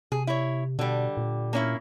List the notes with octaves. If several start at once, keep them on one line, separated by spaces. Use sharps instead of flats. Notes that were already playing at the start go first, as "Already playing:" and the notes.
C3 G#4
E4 C#5
B2 D3 G3
A#2
A#3 C#4 E4